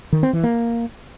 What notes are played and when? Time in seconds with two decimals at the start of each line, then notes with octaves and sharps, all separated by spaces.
0.13 D#3
0.23 C4
0.33 E3
0.44 A#3